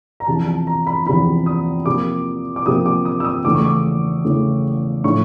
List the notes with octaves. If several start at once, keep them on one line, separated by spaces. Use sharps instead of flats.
A#5
E2 C3 F3 A5
A5
A#5
B5
E2 C3 F3 B5
D#6
C3 F3 A#3 D6
D6
C3 F3 A#3 D#6
D6
D#6
E6
D#6
E2 C#3 E3 A3 D6
C#6
D6
E2 C#3 E3 A3
A2 F3 A3 C#6